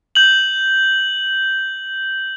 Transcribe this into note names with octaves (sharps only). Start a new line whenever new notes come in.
G6 F#7